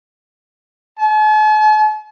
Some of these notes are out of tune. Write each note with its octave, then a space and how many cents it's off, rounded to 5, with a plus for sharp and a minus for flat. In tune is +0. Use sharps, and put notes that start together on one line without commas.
A5 -45